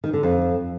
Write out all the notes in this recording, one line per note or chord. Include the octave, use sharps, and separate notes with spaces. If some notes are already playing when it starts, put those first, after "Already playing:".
D#3
D3
F2